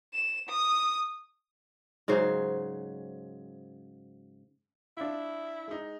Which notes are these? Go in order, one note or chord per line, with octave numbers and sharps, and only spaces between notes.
E7
D#6
G#2 C#3 F#3 C5
D4 E4 F4
G#3 D#4